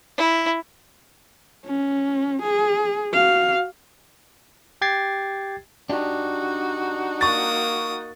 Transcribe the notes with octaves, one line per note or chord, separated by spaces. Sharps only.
E4
C#4
G#4
F#4 F5
G4 G5 G#6 A6 C7
D4 D#4 F#4 G4
A#3 C#6 D#6 A6